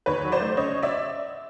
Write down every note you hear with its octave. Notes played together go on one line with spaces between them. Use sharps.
D#2 B4 C#5
F#3
C5 D5
A3
C#3 C#5 D#5
D5 E5